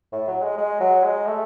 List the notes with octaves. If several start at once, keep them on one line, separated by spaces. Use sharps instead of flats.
A2
F#3
G#3
G#3
F#3
G#3
A3